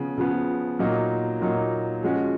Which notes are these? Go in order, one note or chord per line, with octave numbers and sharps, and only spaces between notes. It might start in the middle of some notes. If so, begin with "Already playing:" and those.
Already playing: C#3 F3 B3
C#3 F3 B3
A#2 F#3 A#3 D#4
A#2 F#3 A#3 D#4
F3 G#3 C#4 F#4